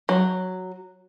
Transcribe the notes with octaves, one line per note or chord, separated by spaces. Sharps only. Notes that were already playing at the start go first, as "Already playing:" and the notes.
F#3